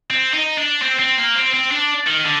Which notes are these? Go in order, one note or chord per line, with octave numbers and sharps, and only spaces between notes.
C4
D#4
D4
C4
C4
A#3
C4
C4
D4
D#3
D3